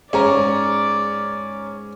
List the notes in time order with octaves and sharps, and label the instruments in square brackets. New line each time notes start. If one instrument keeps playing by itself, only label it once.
[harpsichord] G#2 [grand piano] C#4 C#5 A#5 [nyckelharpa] D5